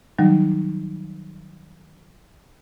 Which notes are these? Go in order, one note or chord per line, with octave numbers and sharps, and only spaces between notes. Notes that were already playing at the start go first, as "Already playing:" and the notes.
D#3 F#3 G3 D#4